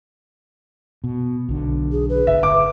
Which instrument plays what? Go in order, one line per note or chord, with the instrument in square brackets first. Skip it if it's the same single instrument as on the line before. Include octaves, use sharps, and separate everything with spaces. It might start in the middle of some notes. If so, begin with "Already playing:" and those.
[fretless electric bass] B2
B1 D3
[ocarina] G#4
B4
[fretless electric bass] G1 [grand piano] E5
[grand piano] D6